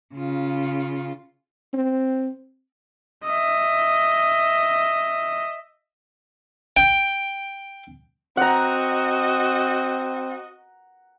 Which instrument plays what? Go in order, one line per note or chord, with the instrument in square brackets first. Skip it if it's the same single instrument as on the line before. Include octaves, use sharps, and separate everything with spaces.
[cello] C#3 F4
[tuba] C4
[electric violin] D#5 E5
[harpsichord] G5
[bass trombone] C4 [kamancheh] F#4 D#5 [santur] F#5 A#5